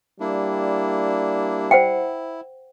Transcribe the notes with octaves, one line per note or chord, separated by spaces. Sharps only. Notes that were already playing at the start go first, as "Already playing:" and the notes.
G3 A#3 D4 E4
E4 C5 F#5 G5